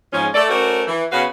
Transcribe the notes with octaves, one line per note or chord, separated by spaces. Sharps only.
G#2 F3 C#4
A3 A4 D5
A3 C#4 F#4 A#4 C5 D5
E3
C#3 B3 C#4 F#4 B4 F5